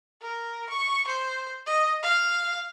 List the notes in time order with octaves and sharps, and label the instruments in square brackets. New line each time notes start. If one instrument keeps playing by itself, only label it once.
[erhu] A#4
C#6
C5
D#5
F5